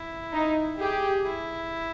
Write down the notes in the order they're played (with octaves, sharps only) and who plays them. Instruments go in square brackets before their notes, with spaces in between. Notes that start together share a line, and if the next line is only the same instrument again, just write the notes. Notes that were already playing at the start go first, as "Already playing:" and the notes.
Already playing: [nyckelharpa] E4
[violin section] D#4
[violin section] G4 [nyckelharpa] G#4
[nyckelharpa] E4